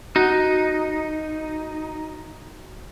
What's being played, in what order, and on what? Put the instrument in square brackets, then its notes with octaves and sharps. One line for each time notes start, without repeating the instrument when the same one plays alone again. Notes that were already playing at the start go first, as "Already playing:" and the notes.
[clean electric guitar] D#4 [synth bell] F#4